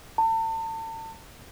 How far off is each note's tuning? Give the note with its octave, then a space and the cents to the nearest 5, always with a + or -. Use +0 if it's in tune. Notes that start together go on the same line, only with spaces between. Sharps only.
A5 +35